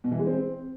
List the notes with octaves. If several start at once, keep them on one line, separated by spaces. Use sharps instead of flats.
B2
E3
G#3
C4